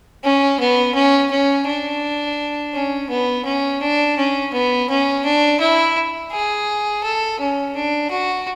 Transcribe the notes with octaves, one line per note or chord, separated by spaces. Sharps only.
C#4
B3
C#4
C#4
D4
C#4
B3
C#4
D4
C#4
B3
C#4
D4
E4
G#4
A4
C#4
D4
F#4